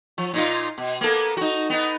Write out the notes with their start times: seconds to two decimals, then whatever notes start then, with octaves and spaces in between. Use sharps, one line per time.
0.18 F3
0.33 A#2 D#4 F4
0.78 B2
1.01 A#3 B3 A4
1.37 D#4 F#4
1.70 B3 D#4